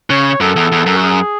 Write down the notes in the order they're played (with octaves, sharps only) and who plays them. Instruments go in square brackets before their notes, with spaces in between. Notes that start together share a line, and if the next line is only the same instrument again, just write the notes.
[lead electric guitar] C#3 [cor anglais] C#5
[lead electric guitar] F#2 [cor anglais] A4
[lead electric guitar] E2
E2
F#2
[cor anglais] F#4
G#4